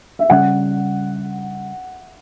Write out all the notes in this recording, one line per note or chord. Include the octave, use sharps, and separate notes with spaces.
E5
C#3 G3 C#4 F#5